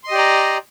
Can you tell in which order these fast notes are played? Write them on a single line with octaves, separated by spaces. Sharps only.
C6 D#5 G4 D5 A#5